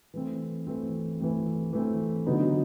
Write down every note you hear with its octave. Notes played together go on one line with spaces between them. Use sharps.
E3 A3 C4
E3 A3 C4
E3 A3 C4
E3 A3 C4
D3 F#3 B3 D#4